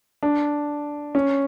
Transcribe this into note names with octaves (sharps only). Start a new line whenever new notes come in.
D4
C#4